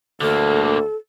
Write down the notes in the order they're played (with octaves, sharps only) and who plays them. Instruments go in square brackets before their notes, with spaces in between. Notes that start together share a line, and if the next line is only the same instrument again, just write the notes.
[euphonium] D2 [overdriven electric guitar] D3 A#3 [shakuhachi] A4